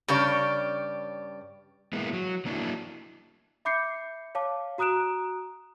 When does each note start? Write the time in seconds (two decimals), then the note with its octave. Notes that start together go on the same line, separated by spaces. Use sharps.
0.08 G2 C#3 G4 C#5 D5
1.93 G#3 A#3 B3 E4
2.13 F#3
2.45 F#3 A#3 D4 E4
3.65 E5 B5 D6 G6 C7 C#7
4.35 C#5 F5 A5 D6
4.78 F#4 A#5 D#6 F#6 D7 E7